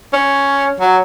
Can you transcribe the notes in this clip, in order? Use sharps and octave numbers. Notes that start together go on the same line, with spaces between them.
C#4
F#3